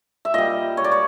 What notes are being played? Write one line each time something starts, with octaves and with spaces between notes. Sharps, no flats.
E5
A#2 G3 D#5
C#5
D5
C#5